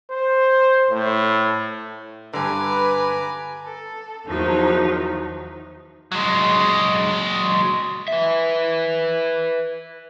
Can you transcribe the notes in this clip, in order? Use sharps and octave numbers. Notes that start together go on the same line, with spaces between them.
C5
A2
G2 D3 B4 G#5 A#5 D6
A4
E2 D#3 F3 F#3 D#4
F#3 G#3
B4 E5